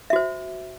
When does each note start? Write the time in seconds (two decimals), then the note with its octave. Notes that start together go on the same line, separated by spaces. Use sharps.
0.10 E5
0.13 F#4
0.16 C5